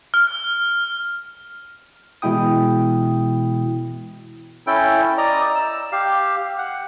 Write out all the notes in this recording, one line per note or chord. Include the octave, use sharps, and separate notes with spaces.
F6
B2 E3 G#3 E4 G5 D#6
C#4 E4 A4 G5
D5 D#5 A#5
E6
G4 F5
F#5